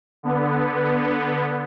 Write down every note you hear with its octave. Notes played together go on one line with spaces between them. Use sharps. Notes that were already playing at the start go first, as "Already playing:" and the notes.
D3 B3